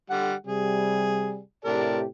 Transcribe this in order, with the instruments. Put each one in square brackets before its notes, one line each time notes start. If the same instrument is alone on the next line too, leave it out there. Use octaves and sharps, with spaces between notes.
[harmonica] D3 G3 F#5
[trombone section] C3 G3 [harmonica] G#4
[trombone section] A2 C3 G4 [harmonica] A#4 D5 A5